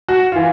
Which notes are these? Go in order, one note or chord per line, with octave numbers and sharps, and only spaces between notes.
F#4
E3 F4